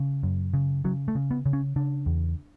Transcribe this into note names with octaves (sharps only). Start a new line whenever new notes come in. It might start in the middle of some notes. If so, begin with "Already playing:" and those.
Already playing: C#3
F#2
C#3
C#3 F#3
A3
C#3
B3
C#3
C#4
C#3 D4
E2